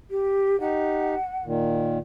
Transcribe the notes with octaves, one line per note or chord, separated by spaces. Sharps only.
G4
D#4 G4 F#5
A#2 D#3